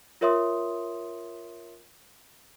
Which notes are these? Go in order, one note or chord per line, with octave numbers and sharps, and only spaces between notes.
F4 A#4 C#5 E5 C6 D#6